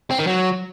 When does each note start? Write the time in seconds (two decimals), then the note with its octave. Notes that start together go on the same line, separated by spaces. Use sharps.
0.11 C4
0.19 D#3
0.27 F#3